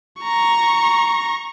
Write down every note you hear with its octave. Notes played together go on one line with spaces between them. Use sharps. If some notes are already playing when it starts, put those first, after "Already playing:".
A#5 C#6